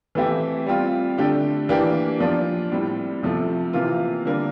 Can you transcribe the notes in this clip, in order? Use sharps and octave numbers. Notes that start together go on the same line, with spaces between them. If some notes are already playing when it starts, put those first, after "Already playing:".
E3 A3 C4 E4 G4
G3 C4 F4
D3 A3 D4 G4
E3 A#3 D4 G4
F3 A#3 D4 F4
A2 G3 C4
C3 F3 A3
C3 E3 A#3 F4
D3 G3 A#3 D4